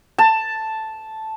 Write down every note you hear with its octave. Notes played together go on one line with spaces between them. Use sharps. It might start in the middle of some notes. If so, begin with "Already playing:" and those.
A5